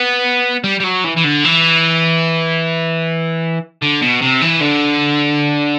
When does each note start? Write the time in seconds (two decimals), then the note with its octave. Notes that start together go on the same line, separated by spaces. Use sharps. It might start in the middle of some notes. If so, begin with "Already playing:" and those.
Already playing: B3
0.64 G3
0.80 G3
0.84 F#3
1.04 E3
1.16 E3
1.24 D3
1.44 E3
3.82 D3
4.01 B2
4.21 C3
4.41 E3
4.60 D3